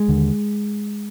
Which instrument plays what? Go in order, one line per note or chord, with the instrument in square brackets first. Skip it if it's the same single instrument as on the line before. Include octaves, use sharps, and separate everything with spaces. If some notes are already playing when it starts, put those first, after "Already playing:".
Already playing: [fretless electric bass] G#3
D#2 D3